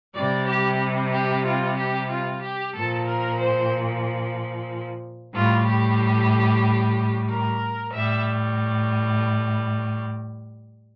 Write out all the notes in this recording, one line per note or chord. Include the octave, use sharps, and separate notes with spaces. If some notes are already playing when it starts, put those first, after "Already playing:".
C3 G3 D5
G4
G4
F4
G4
F4
G4
A#2 F3 A4
A#4
C5
A2 G3 F4
G4
A#4
A2 G3 E5